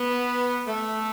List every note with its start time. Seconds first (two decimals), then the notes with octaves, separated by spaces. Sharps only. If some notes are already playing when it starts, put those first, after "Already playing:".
Already playing: B3
0.67 A3